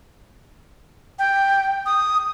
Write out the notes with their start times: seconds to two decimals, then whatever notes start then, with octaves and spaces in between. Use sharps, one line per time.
1.19 G5
1.86 D#6